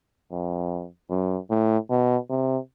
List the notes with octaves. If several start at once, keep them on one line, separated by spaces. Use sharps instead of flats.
F2
F#2
A2
B2
C3